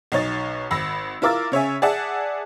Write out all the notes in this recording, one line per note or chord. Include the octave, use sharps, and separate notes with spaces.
B1 D#4 C#5 A6
G#1 B5 E6 A#6
E4 F4 A#4 D6 E6 A6
C#3 C#5 E5 G#5
G#4 D5 E5 F#5 A5